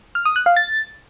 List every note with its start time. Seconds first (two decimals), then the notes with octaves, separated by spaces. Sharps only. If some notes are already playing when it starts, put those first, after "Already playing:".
0.15 F6
0.25 D#6
0.36 F#6
0.46 F5
0.56 A6